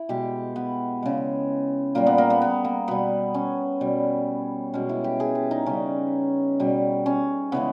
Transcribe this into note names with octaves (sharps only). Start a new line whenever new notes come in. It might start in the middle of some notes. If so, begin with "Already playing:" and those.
Already playing: E4
B2 G#3 G4
B3
C#3 G#3
A#2 G3 A#3
B3
A#3
B3
B3
A#3
B2 G3 B3
C#4
B2 G3
B2 G#3 C#4
E4
G4
G#4
G4
D#4
C#3 G3 C#4
B2 G3
C#4
C#3 E3 G#3 B3